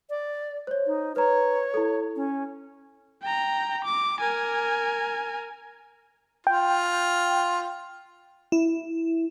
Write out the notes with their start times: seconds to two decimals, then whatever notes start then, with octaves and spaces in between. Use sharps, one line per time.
0.10 D5
0.67 C5 C#5
0.87 D#4
1.16 B4 C#5 A#5
1.74 E4 A4
2.16 C#4
3.22 G5 A#5
3.84 D6
4.21 A#4 G#5
6.47 F4 G5
8.52 E4